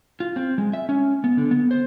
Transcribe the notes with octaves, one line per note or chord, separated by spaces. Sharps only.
F4
C4
G#3
E5
C#4
B3
D3
B3
C5